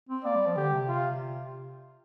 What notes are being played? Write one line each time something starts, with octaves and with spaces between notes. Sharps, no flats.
C4
A#3 D5
G3
F3
D3 G4
C3
F4